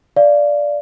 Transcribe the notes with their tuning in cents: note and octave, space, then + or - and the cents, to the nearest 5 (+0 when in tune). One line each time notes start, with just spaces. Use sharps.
D5 -5 F5 -10